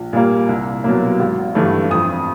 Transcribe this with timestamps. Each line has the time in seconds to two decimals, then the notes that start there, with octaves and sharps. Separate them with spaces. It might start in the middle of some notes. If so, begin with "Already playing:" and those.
Already playing: A#1
0.13 A#2 G3 A#3
0.49 C2
0.84 B2 F#3 A#3
1.19 G#1
1.55 G2 E3 A3
1.90 F2 D#6